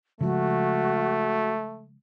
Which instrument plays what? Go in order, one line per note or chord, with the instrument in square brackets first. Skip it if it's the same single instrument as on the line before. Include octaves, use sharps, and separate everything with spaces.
[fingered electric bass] C#3 F3 G#3 [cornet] A3 [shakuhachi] F#4